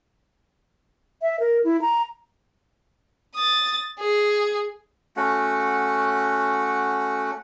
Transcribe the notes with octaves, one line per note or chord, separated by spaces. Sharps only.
E5
A#4
E4
A#5
D#6 A6
G#4
A3 C#4 F#4 F#5